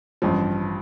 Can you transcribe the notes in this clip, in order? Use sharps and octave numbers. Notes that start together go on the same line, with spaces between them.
A1 G2 F3